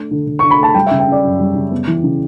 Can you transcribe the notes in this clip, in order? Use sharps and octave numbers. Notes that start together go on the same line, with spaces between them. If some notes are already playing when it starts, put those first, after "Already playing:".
Already playing: A3 D4
D3
D3
D4 C#6
B5
A3 A5
G3 G5
C#3 E5
G5
C#4
D5
F#2
G3
C#3
B3
E3
C#3